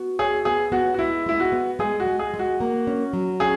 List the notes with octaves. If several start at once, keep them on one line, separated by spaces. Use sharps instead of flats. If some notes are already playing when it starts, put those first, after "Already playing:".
Already playing: B3 F#4
G#4 C#5
B3 G#4
B3 F#4
F#4
G#3 E4
G#3 E4
F#4
B3
G#3 G#4
F#4
G#3
G#4
G#3
F#4
A#3
C#4
F#3
C#4 G#4